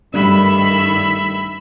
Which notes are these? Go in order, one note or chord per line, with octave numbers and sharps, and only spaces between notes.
G2 D#3 G3 A3 D4 E5 B5